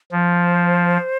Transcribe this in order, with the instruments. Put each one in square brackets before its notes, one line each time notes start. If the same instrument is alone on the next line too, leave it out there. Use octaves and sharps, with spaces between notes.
[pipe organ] F3 [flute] C5